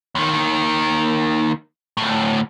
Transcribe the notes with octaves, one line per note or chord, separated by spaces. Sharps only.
D#2 D#3
D2 A2